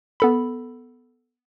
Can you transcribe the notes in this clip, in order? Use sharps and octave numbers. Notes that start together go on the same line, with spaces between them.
B3 A4 B5